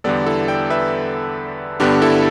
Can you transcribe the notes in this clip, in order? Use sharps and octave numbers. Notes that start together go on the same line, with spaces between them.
E2 D3 G3 B3 A4 D5
E4 A4
D5 G5
B4 E5
G2 D3 B3 D4 G4
E4 A4